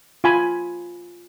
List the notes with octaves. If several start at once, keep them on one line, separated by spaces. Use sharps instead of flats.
F4 G#5 B5